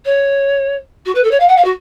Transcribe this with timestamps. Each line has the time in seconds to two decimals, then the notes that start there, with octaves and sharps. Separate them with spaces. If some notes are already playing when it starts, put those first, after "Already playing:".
0.05 C#5
1.05 F#4
1.15 B4
1.24 A4
1.31 C#5
1.40 F5
1.48 F#5
1.56 F5
1.64 F#4